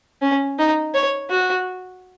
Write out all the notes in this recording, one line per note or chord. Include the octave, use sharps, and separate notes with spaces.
C#4
D#4
C#5
F#4